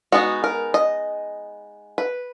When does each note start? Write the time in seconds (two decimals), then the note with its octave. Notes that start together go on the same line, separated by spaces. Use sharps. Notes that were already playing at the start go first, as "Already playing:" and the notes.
0.12 G#3 B3 D#4 F#4
0.44 A#4
0.74 D#5
1.98 B4